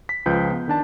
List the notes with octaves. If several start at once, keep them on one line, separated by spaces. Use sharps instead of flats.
B6
C#2 F3 B4 G6
B3
D#3 D4 A5